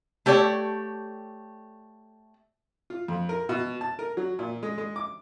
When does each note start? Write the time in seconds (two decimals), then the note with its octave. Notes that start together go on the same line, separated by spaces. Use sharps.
0.26 A3 G4 C#5 D5
2.90 F4
3.08 F2
3.29 A#4
3.49 B2
3.81 A5
3.99 A#4
4.17 F#3
4.39 A#2
4.63 G#3
4.78 G#3
4.96 D6